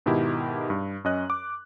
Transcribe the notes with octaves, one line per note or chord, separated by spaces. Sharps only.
G#2 B2 D#3 E4 G4
G2
F#2 C#4 D#5 F#6
D6